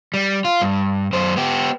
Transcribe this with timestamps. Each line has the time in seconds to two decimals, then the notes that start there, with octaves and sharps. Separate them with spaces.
0.14 G3
0.45 F4
0.61 G2
1.13 F#2 C5
1.36 B3 G4